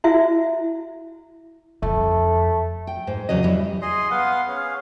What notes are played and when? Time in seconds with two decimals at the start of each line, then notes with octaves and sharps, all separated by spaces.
0.04 E4 F#4 E5
1.82 F2 A3
2.87 G5
3.07 G#2 C5
3.29 E2 C#3 F#3 D#5
3.43 G3 E4
3.82 G#4 D#5 C6 D#6
4.11 B3 F5 F#5 C6
4.48 C#4 G#4 F5